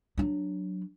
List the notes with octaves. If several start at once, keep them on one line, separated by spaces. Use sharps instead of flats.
F#3 D4